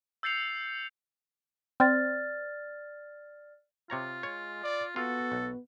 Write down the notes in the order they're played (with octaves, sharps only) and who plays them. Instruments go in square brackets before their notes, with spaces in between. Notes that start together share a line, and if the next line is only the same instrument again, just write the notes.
[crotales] E6 G6 A6 C7 C#7 F7
[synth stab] C4 [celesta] D5 F6 A6
[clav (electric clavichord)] C3 C#5 A#5 [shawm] F4
[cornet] G#3 [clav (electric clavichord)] C#5
[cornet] D5
[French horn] B3 [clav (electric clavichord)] F4 [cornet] F#4 [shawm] A4
[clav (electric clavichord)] B1